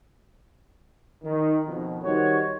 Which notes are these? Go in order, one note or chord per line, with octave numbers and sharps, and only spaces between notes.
D#3
F2 B2 D#3
D#3 G3 D#4 F#4 C5 C#5